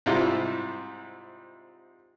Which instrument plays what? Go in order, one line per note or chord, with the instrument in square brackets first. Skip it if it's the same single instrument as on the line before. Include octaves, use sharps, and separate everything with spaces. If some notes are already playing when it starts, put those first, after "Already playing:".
[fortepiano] G#2 C3 G3 E4 F4